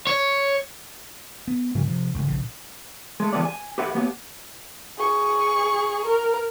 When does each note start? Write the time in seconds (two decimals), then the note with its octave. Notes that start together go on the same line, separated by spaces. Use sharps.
0.07 C#5
1.48 B3
1.75 G2 C#3 F3 F#3
1.88 C3 F3
2.14 G1 C#2
2.28 A#1 C#3
3.20 G#3 A3
3.33 E3 G#3 A3 B3 G4 D5
3.45 G#5
3.78 G4 A4 B4 E5 F#5
3.94 F#3 A#3 B3 G4
4.99 G#4 C#6
6.06 A#4